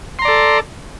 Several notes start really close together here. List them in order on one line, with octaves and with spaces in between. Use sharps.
C6 A#5 D5 A4